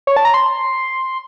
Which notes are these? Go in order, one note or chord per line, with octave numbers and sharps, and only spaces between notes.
C#5
A5
A#5
C6